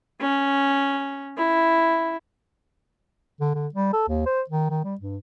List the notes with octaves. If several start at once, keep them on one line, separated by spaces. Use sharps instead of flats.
C#4
E4
D3
D3
G3
A4
D#2
C5
D#3
D#3
G3
G2